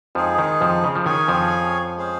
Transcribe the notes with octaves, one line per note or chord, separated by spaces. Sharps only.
F2 F3 G#3 D#4 G#4
D#3
F2 F3
C#3
F3
D#3 C#4 G#4 C#5 F5 G#5
F2 F3
G#3 C#4 G#4 C5 F5